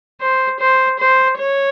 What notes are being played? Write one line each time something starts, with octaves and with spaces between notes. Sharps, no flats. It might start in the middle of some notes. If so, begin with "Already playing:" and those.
C5
C5
C5
C#5